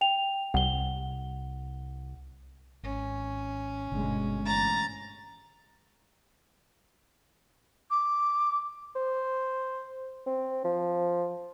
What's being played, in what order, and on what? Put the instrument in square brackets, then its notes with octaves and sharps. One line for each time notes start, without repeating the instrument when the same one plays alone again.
[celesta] G5 F7
[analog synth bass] C2 [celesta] F#5 G7
[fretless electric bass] G#1 [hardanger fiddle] C#4
[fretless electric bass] G1 D3 [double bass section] B2 G#3
[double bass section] A1 [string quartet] A#5 A6
[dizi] D6
[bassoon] C5
C4
F3